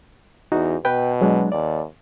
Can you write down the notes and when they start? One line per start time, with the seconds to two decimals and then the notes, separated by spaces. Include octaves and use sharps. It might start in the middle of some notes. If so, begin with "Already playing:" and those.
0.52 E2 D#4 F#4
0.85 B2 B4 G5
1.21 F#3 G#3 D4
1.52 D#2 D5